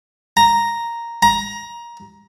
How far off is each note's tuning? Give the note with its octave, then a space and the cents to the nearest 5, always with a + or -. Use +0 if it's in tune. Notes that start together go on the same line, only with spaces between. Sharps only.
A#5 +0
A#5 +20